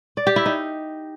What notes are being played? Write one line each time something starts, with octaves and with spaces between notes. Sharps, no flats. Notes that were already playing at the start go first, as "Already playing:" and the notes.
D5
G4
E4
D#4